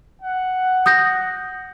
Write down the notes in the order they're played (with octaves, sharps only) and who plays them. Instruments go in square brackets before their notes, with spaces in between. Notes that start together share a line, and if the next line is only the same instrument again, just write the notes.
[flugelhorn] F#5
[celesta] D#6 G6 A#6